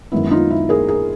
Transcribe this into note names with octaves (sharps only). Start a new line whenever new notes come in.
F#2 D#3 G#3 B3 E4
D#4 F4
E4
G#4 A#4
G#4 A#4